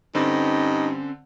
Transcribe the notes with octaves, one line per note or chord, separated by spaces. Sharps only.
G2 D3 C4 C#4 D#4